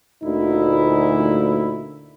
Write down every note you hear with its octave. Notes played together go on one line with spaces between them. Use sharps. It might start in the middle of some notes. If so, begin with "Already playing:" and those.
D2 A#2 D#4 E4